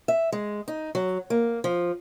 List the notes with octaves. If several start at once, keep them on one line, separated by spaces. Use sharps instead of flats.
E5
G#3
D#4
F#3
A#3
F3